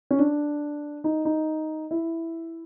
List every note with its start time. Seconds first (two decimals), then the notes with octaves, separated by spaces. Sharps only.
0.11 C#4
0.19 D4
1.04 D#4
1.25 D#4
1.91 E4